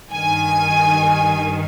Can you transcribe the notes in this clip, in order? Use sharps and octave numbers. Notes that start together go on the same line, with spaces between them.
G2 D#3 G#5